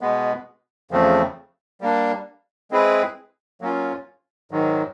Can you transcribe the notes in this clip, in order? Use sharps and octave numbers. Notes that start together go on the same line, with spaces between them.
B2 G#3 B3
E2 C#3 F3 A3 C4
G3 A#3 D4
G#3 C4 E4 G#4 B4
F#3 A#3 C#4 F4
G#2 D#3 F#3